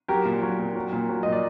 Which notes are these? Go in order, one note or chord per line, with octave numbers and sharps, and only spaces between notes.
F#3 G4 A#4
A#2
F#3
A#2
F#3
A#2
F#3
A#2 D#5
D5